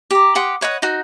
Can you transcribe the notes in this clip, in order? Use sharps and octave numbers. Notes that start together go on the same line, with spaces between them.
G4 A#5
G4 F#5 C6 D#6
B4 C#5 D#5 F#5
D#4 F#4